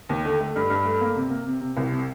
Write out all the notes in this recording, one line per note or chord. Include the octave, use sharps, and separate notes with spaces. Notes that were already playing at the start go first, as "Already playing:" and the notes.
D#2
D3
A3
G2
G2
A3
A#3
C3
A#3
C3
C3
C2
C3